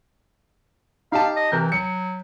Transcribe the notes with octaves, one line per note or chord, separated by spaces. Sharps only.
D#4 G4 F5 A5
D#5
C3 E3 A#4 G6
F#3 C#7